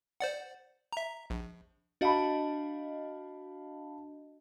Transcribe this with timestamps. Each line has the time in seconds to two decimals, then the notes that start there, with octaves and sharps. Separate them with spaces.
0.20 C5 D5 F#5
0.93 E5 A#5
1.30 A#1
2.01 D4 F#4 D#5 F5 A5 B5